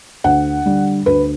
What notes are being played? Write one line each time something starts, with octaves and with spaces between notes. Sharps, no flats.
D2 F#5
D3 G3
D2 B4